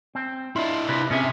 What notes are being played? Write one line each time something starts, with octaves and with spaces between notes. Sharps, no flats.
C4
D4 E4 F4
C3 B4
C3 C#4 G#4 E5